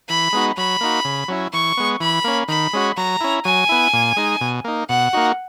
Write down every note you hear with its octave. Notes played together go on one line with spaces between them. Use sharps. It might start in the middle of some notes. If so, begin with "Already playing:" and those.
E3 B5
G#3 B3 D#4 F#4
F#3 B5
A#3 D#4 F#4
C#3
F#3 C#4 E4
E3 C#6
G#3 B3
E3 B5
A#3 C#4
D#3 B5
G#3 C#4 F#4
F#3 A#5
C#4 E4
F#3 G#5
B3 E4
A#2
G#3 D#4
B2
A#3 D#4
B2 F#5
A#3 D#4 F#4